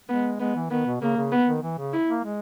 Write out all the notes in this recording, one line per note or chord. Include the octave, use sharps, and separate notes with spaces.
G#3 B3
G#3 B3
E3
D#3 B3
B2
C#3 A#3
C#3
B3
D#3
E3
C#3
E4
A#3
G#3